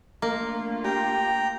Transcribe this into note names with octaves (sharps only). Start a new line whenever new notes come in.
A3 A#3 D4 F4
G4 G5 A#5